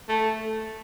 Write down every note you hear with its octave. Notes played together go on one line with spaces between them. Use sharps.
A3